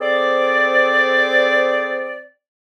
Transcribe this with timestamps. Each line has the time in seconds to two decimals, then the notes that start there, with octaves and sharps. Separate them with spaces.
0.01 C4 G#4 A4 C5 D5